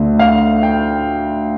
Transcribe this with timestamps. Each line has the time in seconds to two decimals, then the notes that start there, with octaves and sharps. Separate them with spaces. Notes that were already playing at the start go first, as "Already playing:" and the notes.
Already playing: D2 D3 A3
0.19 F5
0.63 G5